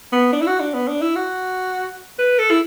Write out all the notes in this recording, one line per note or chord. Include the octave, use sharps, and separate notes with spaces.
B3
D4
E4
F#4
D4
B3
D4
E4
F#4
B4
A4
E4